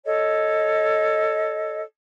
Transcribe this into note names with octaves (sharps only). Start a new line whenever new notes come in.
A4 C#5 D#5